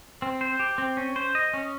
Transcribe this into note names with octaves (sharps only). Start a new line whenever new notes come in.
C4
C5
G4
C4
C#4
C5
D#5
C#4